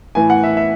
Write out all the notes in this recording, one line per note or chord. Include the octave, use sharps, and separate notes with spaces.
A2 E3 G#5
F#5
E5
E5